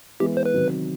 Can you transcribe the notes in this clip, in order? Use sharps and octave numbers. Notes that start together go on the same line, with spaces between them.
E3 G#3 B3 G4
C5
B4
C3 D#3 F#3